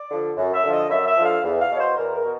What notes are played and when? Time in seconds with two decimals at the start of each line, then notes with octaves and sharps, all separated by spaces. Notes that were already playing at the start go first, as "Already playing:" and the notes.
Already playing: D5
0.10 D3 F3
0.37 F#2
0.54 E5
0.63 D3 F3
0.73 D#5
0.89 F#2 E5
1.07 E5
1.17 D3 F3
1.25 F5
1.44 E2
1.61 F5
1.71 B2 C#5
1.80 C5
1.97 E2 A#4
2.16 A#4
2.23 B2